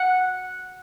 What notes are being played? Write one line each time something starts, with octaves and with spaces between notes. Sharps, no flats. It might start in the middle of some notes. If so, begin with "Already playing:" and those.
Already playing: F#5